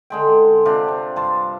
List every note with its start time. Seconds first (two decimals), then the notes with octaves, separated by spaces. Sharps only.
0.10 D3 G#3 G5
0.65 C3 D4 F4
0.88 C3
1.16 G2 A5 C6